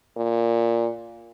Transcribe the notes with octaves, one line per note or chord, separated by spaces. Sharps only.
A#2